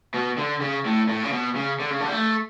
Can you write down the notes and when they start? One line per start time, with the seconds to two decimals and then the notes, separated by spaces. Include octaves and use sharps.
0.14 B2
0.38 D3
0.61 C#3
0.85 A2
1.09 A2
1.24 C#3
1.33 B2
1.56 C#3
1.80 D3
1.91 C#3
2.00 D3
2.07 G3
2.12 A3